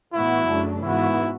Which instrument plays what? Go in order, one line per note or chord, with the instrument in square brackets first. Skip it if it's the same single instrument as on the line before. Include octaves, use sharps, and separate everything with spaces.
[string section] A2 E3 B3 F#4 [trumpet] E4
[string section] F#2 C#3 F#3 A3 D4
[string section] G#2 E3 B3 F#4 [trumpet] E4